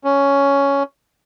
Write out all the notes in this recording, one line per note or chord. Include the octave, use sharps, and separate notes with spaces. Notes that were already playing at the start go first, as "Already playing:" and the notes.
C#4